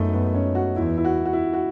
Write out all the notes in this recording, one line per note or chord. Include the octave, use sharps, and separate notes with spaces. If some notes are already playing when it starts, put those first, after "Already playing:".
Already playing: F#2 A3 B3 D#4
B3
C#4
F#4
E2 E4
E4
F#4
F#4
E4
F#4